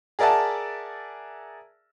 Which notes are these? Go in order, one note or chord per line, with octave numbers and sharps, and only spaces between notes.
G#4 A#4 D5 E5 F#5 A5